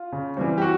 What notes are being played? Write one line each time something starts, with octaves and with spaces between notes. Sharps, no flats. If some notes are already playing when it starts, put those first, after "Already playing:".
Already playing: F4
C#3
E3 G3 C4
G4
F#4